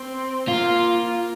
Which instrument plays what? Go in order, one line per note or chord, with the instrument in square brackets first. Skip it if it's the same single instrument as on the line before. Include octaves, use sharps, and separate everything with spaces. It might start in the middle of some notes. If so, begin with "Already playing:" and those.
Already playing: [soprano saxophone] C4
[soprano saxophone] A#3 [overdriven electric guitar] F4